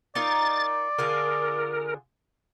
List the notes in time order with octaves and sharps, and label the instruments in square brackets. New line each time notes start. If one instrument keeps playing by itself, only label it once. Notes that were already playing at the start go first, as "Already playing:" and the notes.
[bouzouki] D#4 F4 A#4 [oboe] D5 [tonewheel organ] A6
[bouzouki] D3 F4 G#4 [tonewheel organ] A#4